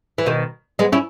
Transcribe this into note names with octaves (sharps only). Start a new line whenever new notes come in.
E3
B2 D#3
G#3 B3
C#4 E4